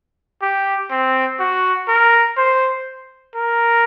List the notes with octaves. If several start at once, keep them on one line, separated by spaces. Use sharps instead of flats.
G4
C4
F#4
A#4
C5
A#4